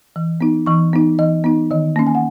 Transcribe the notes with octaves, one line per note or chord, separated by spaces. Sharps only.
E3
B3 D#4
E3 C#6
B3 D#4
E3 D#5
B3 D#4
D#3 D#5
A#3 C#4
G#5
F#5